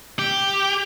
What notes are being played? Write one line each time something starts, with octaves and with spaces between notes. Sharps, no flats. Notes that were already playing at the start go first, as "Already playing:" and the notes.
G4